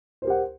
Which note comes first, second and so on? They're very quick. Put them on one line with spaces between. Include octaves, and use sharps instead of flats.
C5 A#4 G4 F#5